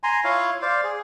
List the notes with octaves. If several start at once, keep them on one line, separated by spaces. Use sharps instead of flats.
G#5 A#5 C6
E4 F4 C#5 F5
C5 D5 F5
G#4